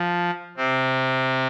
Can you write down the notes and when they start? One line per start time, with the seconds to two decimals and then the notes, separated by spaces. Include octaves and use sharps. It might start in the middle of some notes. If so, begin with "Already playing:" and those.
Already playing: F3
0.57 C3 C4